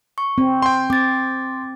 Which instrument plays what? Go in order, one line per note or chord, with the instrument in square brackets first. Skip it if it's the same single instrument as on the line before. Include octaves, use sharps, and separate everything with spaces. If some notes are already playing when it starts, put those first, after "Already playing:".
[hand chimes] C#6
[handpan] C4
[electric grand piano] G5 C6
[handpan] C4 [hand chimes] D6 A6